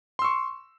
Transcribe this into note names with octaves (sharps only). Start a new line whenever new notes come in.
C6 C#6 E6